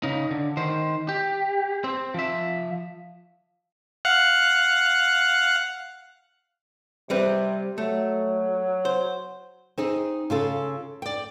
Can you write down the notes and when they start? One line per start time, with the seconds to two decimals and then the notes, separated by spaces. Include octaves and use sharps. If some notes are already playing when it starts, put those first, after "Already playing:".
0.03 C#3 D#4
0.31 D3
0.57 D#3 C5
1.09 G4
1.84 C4
2.14 F3 E5
4.05 F5 F#5 F#6
7.10 C3 G3 C4 B4
7.78 F#3 A3
8.85 C5
9.78 C4 D#4 G#4
10.30 C#3 F4 A4
11.02 D5 G5